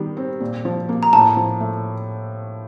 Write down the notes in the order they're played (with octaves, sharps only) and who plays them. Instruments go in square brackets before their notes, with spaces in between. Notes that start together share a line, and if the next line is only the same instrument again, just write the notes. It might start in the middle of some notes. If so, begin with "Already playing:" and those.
Already playing: [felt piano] D#3 G3 B3
C4
A#2
F3
A#3
[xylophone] A#5
[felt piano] A2 [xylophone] A5
[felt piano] F3
A3